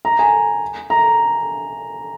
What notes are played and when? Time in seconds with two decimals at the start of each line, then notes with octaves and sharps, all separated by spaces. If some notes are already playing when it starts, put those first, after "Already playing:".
0.05 A#5
0.19 G#5
0.90 A#5